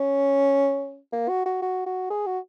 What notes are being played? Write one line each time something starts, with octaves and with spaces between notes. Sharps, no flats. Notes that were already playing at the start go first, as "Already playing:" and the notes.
Already playing: C#4
A#3
F#4
F#4
F#4
F#4
G#4
F#4